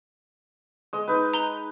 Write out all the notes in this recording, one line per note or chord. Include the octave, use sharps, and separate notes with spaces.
G#3 D#5
D#4 B4
A#5 G7